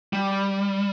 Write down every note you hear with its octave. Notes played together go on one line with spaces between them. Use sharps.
G3